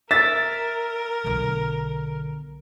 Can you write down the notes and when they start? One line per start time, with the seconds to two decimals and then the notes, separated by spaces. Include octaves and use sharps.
0.11 A#4 E5 A6
1.24 B1 D3